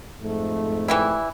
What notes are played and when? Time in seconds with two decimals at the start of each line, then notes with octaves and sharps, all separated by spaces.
0.23 F2 G#2 A3
0.88 E3 G3 E4